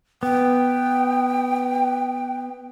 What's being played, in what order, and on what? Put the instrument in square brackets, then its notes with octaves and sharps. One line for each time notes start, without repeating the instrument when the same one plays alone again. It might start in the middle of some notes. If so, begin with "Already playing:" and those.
[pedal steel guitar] B3 [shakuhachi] G5